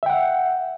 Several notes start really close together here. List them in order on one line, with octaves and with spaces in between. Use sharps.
E5 G5 F#5